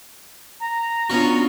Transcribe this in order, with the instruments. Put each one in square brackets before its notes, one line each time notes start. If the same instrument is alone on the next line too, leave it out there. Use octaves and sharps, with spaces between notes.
[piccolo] A#5
[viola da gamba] B3 D4 F4 [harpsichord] C#4 F#4